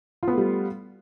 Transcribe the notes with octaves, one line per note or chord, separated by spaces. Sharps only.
G3 A3 B3 F4